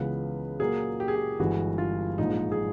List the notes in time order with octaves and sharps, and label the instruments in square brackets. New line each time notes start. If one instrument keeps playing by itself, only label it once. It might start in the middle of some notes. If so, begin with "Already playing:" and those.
Already playing: [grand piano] C#2 C#3 E3 G#3 B3 [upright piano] B4
[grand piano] A#2 F#3 A#3 [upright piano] G#4
[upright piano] G4
G#4
G4
[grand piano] G1 G2 E3 G#3 [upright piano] F#4
[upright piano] F4
[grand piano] A#1 G#2 F3 [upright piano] D#4
[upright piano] G#4